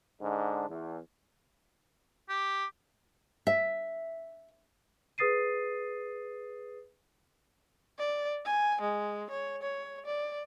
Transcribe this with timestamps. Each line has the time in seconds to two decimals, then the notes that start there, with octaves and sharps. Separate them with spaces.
0.20 G#2 D3 G#3 D4
0.68 E2
2.29 G4
3.47 E5
5.18 G#4 B4 D#6 A6 C7 D#7
7.98 D5
8.45 G#5
8.81 G#3
9.30 C#5
9.62 C#5
10.05 D5